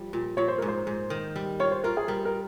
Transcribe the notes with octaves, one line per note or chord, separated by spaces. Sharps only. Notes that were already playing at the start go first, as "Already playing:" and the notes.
Already playing: F3 G3
A#2
A#2 C#5
C5
G#2 A#4
C5
G#2
D#3
G3
F4 C#5
C5
F4 A#4
G#4
G3 A#4
A#4